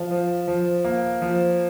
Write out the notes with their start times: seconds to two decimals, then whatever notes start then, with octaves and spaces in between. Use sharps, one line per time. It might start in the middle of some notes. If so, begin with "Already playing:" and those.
Already playing: F3 F5
0.11 F3
0.48 F3
0.84 A#3
1.22 F3